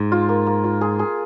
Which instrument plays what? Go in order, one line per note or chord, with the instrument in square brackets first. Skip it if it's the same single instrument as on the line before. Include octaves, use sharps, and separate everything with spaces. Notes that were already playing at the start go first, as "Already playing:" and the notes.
Already playing: [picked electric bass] G#2
[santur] F4
A#3
A#3
F4
G#4
G#4